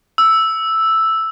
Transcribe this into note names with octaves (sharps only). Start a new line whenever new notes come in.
E6